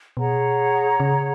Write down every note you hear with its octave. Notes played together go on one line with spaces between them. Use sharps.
B2 G#4 C#5 F#5 A#5
C#3